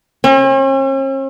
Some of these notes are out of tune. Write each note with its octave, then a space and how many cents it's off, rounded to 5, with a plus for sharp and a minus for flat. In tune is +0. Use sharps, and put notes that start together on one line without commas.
C#4 -45